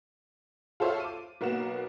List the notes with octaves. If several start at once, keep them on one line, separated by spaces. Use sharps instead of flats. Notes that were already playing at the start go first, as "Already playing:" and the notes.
F4 A4 C5 C#5 E5 F5
D6 D#7
B1 A#3 B3 F#4 E7